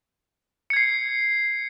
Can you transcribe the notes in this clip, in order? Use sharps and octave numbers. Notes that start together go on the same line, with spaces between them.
G#6 C7 C#7